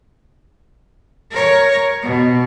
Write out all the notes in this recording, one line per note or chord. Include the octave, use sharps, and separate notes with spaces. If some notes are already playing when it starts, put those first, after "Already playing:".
A#4 C#5
B2